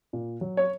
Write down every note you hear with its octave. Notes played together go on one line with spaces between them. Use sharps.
A#2
F#3
C#5